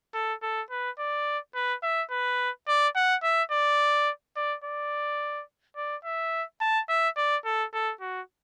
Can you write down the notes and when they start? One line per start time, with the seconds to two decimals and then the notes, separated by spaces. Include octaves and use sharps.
0.14 A4
0.42 A4
0.70 B4
0.99 D5
1.55 B4
1.83 E5
2.10 B4
2.68 D5
2.96 F#5
3.23 E5
3.51 D5
4.36 D5
4.64 D5
5.76 D5
6.04 E5
6.61 A5
6.89 E5
7.17 D5
7.45 A4
7.73 A4
8.01 F#4